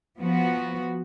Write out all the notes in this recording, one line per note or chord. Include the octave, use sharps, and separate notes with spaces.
F3 B3 F#4